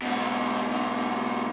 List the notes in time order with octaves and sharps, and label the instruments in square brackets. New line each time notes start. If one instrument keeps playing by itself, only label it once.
[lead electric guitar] G#2 B2